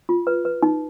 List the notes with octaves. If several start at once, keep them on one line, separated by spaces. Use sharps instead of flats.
F4
B4
B4
D#4